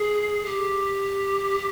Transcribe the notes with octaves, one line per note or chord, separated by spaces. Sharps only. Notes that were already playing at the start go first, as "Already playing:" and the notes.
Already playing: G#4
G4